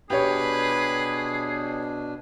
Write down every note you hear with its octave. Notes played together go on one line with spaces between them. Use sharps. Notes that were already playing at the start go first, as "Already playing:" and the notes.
B2 D4 G4 G#4 B4 C#5